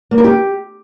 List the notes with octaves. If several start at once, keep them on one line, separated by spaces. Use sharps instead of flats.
A#3
A#4
G4